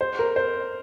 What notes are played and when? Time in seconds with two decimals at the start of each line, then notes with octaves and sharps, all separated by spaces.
0.01 C5
0.19 A#4
0.36 C5